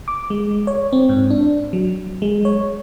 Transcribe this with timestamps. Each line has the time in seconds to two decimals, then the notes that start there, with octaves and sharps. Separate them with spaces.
0.08 D6
0.30 G#3
0.67 C#5
0.93 C4
1.09 G#2
1.30 D4
1.73 F#3
2.22 G#3
2.45 C#5